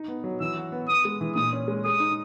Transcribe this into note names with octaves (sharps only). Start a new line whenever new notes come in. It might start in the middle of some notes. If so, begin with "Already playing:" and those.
Already playing: D#4
B3
F#3
E3 E6
F#4
B3
B3 D#6
G#3
E3
A#2 D#6
C#4
G#3
G#4 D#6
D#4